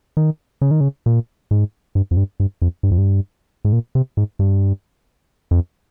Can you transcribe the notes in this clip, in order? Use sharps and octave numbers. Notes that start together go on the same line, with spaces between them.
D#3
C#3
D#3
C#3
A#2
G#2
G2
F2
G2
G2
F2
G2
F2
G2
G#2
A#2
C3
G#2
G2
F2